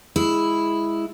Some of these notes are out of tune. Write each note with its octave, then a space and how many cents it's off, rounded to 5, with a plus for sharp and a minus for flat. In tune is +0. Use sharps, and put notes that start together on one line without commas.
G#3 +0 E4 +0